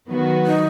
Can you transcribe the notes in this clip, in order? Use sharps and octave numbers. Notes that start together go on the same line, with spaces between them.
D#3 F#3 B3 F#4 B4
D#4